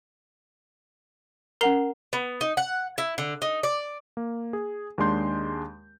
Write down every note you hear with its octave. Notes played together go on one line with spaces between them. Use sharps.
C#4 A#4 F#5 A#5 C7 F7
B3
D#4
F#5
E4
D3
D#4
D5
A#3
G#4
D#2 G#3 D4 C6 G6